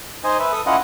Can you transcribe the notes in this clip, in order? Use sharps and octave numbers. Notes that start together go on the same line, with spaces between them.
D#4 C5 D#5 G#5
B4 E5
A4 D#6
C#4 E4 F4 D#5 F#5